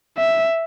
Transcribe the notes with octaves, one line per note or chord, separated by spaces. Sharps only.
E5